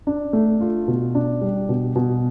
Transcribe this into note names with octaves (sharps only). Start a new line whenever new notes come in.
D4
A3
F4
B2
D4
G3
B2
B2